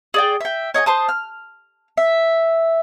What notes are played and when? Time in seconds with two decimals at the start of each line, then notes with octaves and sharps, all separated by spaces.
0.14 G#4 D5 G5
0.41 E5 G5
0.74 C#5 D#5 G5 G#5
0.86 C5 A5 D#6
1.09 F6
1.97 E5